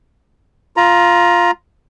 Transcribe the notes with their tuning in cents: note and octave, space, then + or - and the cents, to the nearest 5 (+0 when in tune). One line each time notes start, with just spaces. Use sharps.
F4 +0 A#5 +20